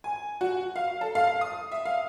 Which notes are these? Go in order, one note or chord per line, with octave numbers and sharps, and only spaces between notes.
G#5
F#4
F5
A4
F5
D#6
E5
F5